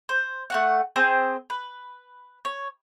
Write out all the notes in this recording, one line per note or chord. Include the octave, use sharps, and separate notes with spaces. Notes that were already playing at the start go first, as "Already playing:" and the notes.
C5
A3 F#4 F#5
C4 G#4 C5
B4
C#5